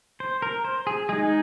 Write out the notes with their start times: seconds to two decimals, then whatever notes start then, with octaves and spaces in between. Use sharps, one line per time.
0.20 C5
0.42 A#4
0.65 C5
0.87 G#4
1.09 G#3 D#4 G#4